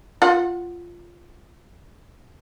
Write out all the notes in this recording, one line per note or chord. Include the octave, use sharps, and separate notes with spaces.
F4 F#5